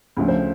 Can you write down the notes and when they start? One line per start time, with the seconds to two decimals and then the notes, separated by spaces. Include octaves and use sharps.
0.17 D2 C#3 F3 A3
0.28 C5